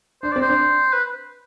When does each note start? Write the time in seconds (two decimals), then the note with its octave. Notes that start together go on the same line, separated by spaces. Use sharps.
0.23 D4 C5
0.32 C4 D5
0.41 C5
0.48 D4
0.93 B4